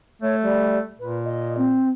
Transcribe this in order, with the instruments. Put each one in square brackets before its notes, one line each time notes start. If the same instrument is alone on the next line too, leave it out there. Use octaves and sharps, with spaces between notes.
[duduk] A3 [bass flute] C#5
[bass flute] G3
[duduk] A#2 [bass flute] B4
[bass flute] D#5
C4